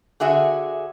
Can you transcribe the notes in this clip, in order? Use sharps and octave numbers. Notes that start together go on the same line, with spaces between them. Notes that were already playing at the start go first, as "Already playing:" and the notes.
D3 F#4 G#4 E5